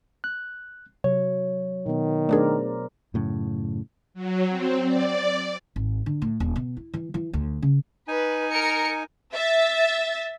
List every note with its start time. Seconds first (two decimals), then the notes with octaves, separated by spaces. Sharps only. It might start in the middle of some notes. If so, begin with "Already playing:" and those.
0.24 F#6
1.04 C3 F#3 C#5
1.86 B2 D#3 B3
2.29 A3 D4 G#4 A#4 C5 D5
3.14 F#2 A2 C#3
4.14 F#3
4.48 C4
4.85 D5
5.76 G#1
6.06 D3
6.22 A2
6.40 D#1
6.56 B2
6.77 E4
6.94 E3
7.14 E3
7.33 D2
7.62 C#3
8.08 D#4 B4 G#5
8.51 A#4 C#7
9.35 E5 A6